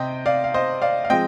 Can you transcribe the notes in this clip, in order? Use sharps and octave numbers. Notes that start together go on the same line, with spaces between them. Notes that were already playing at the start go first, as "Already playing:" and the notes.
Already playing: C3 C4 D#5 G5
D5 F5
F5
C5 D#5
D5 F5
F5
F3 G#3 C4 D#5 G5